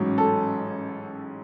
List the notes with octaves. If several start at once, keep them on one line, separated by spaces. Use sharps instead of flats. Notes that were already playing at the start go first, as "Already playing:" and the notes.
Already playing: A1 G#2 F#3 C#4
A4